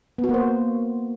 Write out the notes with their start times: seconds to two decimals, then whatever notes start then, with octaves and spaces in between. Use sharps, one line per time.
0.18 B3
0.24 F#4
0.29 A#3
0.34 C5